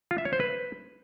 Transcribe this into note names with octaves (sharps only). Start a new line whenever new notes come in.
F4
E5
C#5
C5
B4